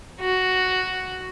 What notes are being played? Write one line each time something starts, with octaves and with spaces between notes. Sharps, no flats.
F#4